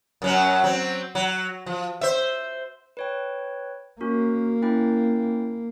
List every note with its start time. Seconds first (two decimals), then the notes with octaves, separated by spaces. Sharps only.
0.22 F#2 F#3 C#4
0.64 F#3 C4
1.15 F#3
1.66 F3
2.01 C5 E5
2.97 B4 C#5 G5
4.01 A#3 C#4 F#4 A#4
4.62 C#4 E4 G5